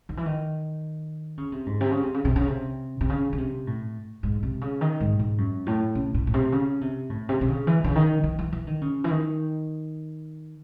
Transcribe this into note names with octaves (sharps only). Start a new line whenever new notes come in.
D#3
E3
D#3
C#3
C3
G#2
C3
C#3
C3
C#3
C3
C#3
C3
C3
C#3
C#3
C3
A2
G#2
C3
C#3
D#3
G#2
G#2
F#2
A2
C#3
A2
A2
C3
C#3
C3
A2
C3
C3
C#3
E3
C#3
D#3
E3
E3
E3
D#3
C#3
E3
D#3